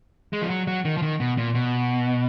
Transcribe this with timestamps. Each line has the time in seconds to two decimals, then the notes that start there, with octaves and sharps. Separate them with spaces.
0.33 G#3
0.41 F3
0.50 F#3
0.67 F#3
0.85 D#3
0.97 F3
1.02 D#3
1.20 B2
1.38 A#2
1.55 B2